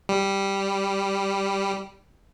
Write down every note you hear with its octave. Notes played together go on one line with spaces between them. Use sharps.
G3